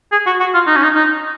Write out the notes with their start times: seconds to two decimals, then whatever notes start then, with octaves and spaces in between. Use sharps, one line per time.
0.12 G#4
0.26 F#4
0.40 F#4
0.54 F4
0.67 D#4
0.76 C#4
0.83 D#4
0.95 D#4